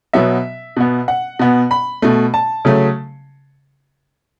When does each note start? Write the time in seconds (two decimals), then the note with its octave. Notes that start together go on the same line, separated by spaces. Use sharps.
0.13 B2 F#3 B3 E5
0.77 B2 B3
1.08 F#5
1.39 B2 B3
1.71 B5
2.02 B2 A3
2.34 A5
2.65 C#3 F#3 A3